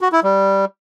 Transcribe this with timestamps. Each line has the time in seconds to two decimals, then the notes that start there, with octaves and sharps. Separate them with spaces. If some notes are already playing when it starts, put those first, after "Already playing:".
0.01 F#4
0.12 E4
0.23 G3